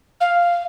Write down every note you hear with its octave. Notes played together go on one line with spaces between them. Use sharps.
F5